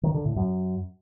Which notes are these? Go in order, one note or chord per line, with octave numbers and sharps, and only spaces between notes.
D#3
D3
A2
F#2